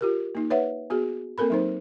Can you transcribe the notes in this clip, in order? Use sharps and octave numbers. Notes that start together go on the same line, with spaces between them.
F4 G4 A#4
A#3 D#4
B4 C#5 E5 F#5
B3 F#4 G#4
A#3 C4 A4 A#4 B5
F#3 D#4 C5